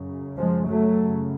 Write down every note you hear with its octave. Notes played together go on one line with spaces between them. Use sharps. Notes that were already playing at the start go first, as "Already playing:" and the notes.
Already playing: F#2 C#3
F3 G#3
F#3 A3
F#2 C#3